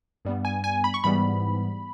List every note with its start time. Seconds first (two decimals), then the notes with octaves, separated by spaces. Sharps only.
0.25 G2 G3 B3
0.45 G#5
0.64 G#5
0.84 B5
0.94 C#6
1.04 G#2 E3 G3 B3 B5